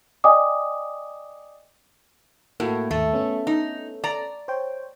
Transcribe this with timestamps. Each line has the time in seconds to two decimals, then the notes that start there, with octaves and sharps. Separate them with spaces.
0.24 D5 D#5 G5 G#5 D6 D#6
2.60 A2 A#3 F#4 A4
2.91 D#2 G#2 A3
3.13 B3 C#4 A4
3.47 D#4
4.04 D5 A#5
4.48 C5 C#5 G5